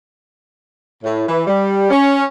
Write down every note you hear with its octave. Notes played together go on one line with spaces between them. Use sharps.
A2
E3
G3
C#4